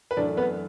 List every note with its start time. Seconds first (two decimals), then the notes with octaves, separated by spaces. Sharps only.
0.11 B4
0.16 F#2 E3 A3 D4 D5
0.37 B3 B4